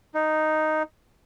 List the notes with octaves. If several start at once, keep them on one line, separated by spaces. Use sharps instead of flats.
D#4